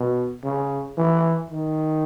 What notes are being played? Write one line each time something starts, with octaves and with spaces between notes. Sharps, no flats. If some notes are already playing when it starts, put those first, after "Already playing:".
Already playing: B2
C#3
E3
D#3